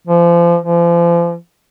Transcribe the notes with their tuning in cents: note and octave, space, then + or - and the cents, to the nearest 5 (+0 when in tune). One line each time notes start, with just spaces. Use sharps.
F3 -30
F3 -35